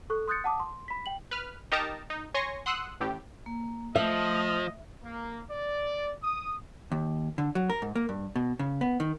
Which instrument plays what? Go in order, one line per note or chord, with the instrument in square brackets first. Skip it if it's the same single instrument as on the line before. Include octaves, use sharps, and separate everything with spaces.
[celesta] A4 C#6 F#6
C6 D#6 F#6 G6 A6 C#7
F#5 A5 D6 D#6
C6
B5 B6
G5 F#7
[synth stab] B4 F6
D#4 G4 A#4 D#5 A5 A#5
D#4
C#5 G#5 C6 C#6 A#6
F#5 C6 D#6 E6 F#6
A1 A2 G4
[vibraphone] A#3
[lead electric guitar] F3 [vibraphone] A3 [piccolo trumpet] D#5 [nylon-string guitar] E5
[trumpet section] A#3
D5
D#6
[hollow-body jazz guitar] D#2
D3
F#3
A#4
G#2
A#3
G2
B2
C#3
B3
D#3